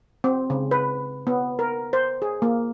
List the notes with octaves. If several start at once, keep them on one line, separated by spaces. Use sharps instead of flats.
C4
C#3
B4
B3
A#4
C5
G#4
A#3